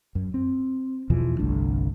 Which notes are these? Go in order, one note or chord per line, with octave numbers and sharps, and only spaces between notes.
F#2
C4
E2 B2 E3 F3
G1 C2 A3 D4